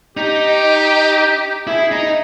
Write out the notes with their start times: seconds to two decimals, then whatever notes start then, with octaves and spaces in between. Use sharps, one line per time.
0.17 D#4 G4
1.67 E4 G#4
1.92 D#4